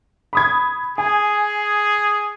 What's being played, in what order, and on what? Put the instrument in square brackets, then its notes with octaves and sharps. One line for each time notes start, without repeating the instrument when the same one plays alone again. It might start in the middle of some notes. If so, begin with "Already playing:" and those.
[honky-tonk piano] B5 D#6 G#6
[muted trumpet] G#4 [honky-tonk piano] G#5